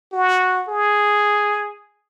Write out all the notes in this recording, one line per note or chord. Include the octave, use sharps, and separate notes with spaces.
F#4
G#4